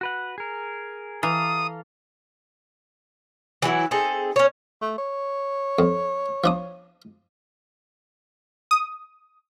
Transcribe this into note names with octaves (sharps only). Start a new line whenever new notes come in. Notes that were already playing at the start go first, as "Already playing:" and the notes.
F#4 B4 F#5
G#4 A#4
E3 A4 F5 A#5 D#6
E3 F#3 E4 F#5
C4 D#4 G#4 A4
C#4 C#5
A3
C#5
F2
F3 D4 D#6
D#6